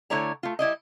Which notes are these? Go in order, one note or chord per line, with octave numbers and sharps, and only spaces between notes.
D3 A3 E4 C#5 D5 A#5
A3 F4
G3 E4 D5 D#5